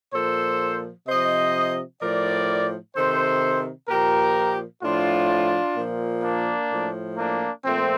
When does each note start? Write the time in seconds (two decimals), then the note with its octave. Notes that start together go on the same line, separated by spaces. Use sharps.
0.13 A#2 F3 A4 C5
1.07 C3 F3 C5 D#5
2.01 A2 F3 A#4 D5
2.96 C3 D#3 A4 C5
3.89 A#2 F3 G4 A#4
4.83 A2 F3 D4 F4
5.77 A#2 F3
6.24 A#3 D4
6.71 A2 F3
7.18 A#3 D4
7.65 A#2 F3 A3 C4